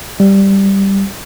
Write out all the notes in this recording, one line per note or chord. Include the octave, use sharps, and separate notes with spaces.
G3